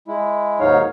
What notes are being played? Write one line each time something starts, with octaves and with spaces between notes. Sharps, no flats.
G#3 E4
D#2 G#2 F#3 D#4 C#5 F5